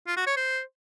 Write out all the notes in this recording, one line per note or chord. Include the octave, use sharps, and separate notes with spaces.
F4
F#4
C#5
C5